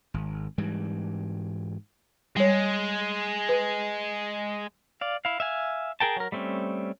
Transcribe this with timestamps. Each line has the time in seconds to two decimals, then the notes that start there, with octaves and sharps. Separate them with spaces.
0.14 G#1
0.58 G#2 E3 G3
2.36 G3 G#3 C#5
3.49 B4
5.01 D5 F5
5.25 E4 F5
5.40 E5 F5 G#5
6.00 G#4 A#4 G5 A5
6.17 F#3 A#4
6.32 G3 A3 C4 C#4